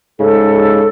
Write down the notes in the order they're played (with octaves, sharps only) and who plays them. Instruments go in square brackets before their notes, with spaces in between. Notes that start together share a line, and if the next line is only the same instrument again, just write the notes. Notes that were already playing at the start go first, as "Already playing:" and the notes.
[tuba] G#2 [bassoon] C#3 [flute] A4